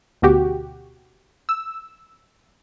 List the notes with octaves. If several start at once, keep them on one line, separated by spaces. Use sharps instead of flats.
D2 B2 F#4 G4
E6